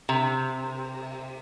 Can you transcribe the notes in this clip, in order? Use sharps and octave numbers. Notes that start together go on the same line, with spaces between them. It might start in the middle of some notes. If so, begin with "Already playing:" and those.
C3